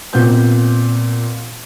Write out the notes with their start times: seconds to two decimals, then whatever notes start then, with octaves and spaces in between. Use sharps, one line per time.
0.13 A#2 B3 C4 G6